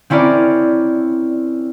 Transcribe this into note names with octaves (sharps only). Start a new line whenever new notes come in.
C4 C#4 E4 A#4 D5